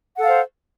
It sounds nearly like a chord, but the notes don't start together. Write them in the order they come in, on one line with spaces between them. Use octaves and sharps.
F#5 A4 F5 C5